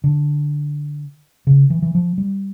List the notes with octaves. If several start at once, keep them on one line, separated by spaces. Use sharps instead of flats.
D3
C#3
E3
E3
F3
G3